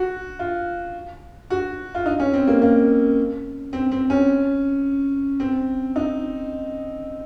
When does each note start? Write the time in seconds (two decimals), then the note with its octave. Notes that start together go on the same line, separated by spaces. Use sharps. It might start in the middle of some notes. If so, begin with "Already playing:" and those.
Already playing: F#4
0.39 F4
1.50 F#4
1.95 F4
2.06 D#4
2.20 C#4
2.33 C4
2.47 A#3
2.62 A#3
3.73 C4
3.91 C4
4.10 C#4
5.40 C4
5.96 D#4